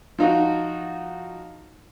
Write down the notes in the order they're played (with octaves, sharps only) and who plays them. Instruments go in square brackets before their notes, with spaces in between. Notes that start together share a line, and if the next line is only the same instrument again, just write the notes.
[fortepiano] F3 D#4 F4 F#4